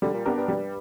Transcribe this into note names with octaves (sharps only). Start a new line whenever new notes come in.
D3 G3
A#2
G2 B3 D4 G4 A#4
G2
G2 G3